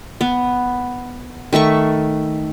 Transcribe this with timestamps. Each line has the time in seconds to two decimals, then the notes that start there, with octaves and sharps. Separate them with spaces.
0.21 B3
1.53 D#3 A3 E5 C#6